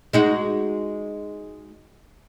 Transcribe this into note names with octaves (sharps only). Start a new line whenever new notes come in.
G#3 D#4 F#4